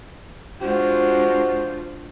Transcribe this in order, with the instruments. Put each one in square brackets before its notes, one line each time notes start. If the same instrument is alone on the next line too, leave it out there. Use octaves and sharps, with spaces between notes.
[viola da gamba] G#3 [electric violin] D4 F4 [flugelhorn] F#4 [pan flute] C5